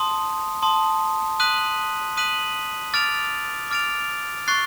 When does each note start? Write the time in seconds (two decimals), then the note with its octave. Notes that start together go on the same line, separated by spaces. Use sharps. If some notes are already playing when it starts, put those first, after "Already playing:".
Already playing: A5 C6 D#6
0.63 A5 C6 D#6
1.40 D#6 F#6 B6 D#7 F#7
2.17 D#6 F#6 B6 D#7 F#7
2.94 D6 F6 A6 D7 F7
3.71 D6 F6 A6 D7 F7
4.48 C#6 F#6 A6 C7